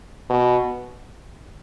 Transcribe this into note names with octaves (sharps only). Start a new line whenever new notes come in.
B2